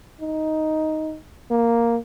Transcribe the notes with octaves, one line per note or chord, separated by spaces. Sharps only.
D#4
A#3